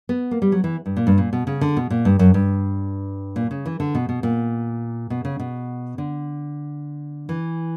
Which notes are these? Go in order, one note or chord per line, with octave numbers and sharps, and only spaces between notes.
B3
A#3
G3
F#3
E3
G2
A#2
G2
A#2
B2
C#3
D3
B2
A#2
G2
F#2
G2
A#2
C#3
E3
D3
B2
B2
A#2
B2
C#3
B2
D3
E3